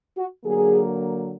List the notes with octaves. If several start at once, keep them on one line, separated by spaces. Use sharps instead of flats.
F#4
D3 F#3 A#3 G#4